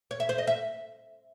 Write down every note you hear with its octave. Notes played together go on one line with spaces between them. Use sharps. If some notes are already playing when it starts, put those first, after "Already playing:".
C#5
E5
C5
D#5
E5